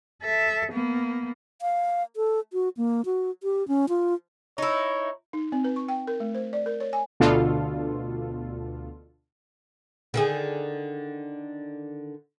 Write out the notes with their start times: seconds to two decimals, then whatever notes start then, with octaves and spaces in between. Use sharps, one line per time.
0.23 A4 E5
0.72 A#3 B3
1.62 F5
2.16 A4
2.53 F#4
2.77 A#3
3.05 F#4
3.43 G4
3.68 C#4
3.89 F4
4.58 D#4 E4 C#5
5.33 D#4
5.52 C4
5.64 B4
5.76 C#6
5.88 G5
6.07 A#4
6.20 A3
6.34 C5
6.53 D5
6.66 A#4
6.80 C#5
6.93 G#5
7.20 D2 B2 D4 F4 A4
10.14 D3 D#3 G#4